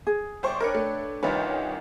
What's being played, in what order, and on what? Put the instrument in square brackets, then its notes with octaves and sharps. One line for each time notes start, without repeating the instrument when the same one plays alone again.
[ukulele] G#4
[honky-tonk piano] G1 C5 C#6 [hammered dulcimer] D5 G5
[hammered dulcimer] D4 B4 C#5 [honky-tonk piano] A#4 C#7
[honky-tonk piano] A3
[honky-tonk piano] C2 D#3 C#4 [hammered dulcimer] D#4 F4 F#5 [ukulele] B4